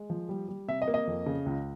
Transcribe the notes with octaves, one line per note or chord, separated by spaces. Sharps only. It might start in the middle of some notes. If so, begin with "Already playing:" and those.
Already playing: G#3
F3
G3
G3
C3 E5
D#5
A#3
D#5
F2
C#3
C#2